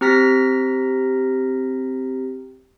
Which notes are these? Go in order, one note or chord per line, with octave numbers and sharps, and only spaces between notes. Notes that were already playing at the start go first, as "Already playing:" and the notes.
C4 G4 A#5 F6 A#6 B6